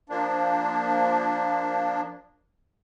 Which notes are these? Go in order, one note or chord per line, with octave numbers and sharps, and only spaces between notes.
F3 A#3 D4